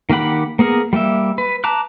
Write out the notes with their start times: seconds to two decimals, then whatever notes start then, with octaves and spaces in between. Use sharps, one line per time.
0.10 D#3 A#3 G4 F#5 B5
0.59 A#3 B3 G#4 A#4
0.93 G3 A#3 G4 E5
1.38 B4
1.64 A5 A#5 D6 F#6